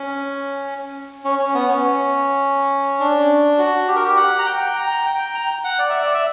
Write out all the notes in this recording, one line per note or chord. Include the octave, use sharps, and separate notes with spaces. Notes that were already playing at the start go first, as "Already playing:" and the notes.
Already playing: C#4
C#4
C#4
B3
C#4
D4
F#4
G4
A#4
G4
F#5
A#5
G5
A#5
G5
A#5
F#5
D5
E5
D5
E5